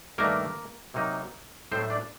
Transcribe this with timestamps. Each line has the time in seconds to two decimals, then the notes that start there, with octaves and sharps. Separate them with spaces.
0.18 G2 D#3 A3 A#3 D4 A#4
0.94 C3 F#3 A#3 D#4
1.72 A2 F#3 A3 C4 D#4 C5
1.90 D4 D5